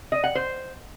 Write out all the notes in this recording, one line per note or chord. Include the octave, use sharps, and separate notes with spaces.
D#5
F#5
C5